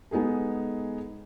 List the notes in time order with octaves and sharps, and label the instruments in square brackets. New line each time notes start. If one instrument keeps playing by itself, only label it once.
[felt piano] G#3 B3 D#4 G#4 A4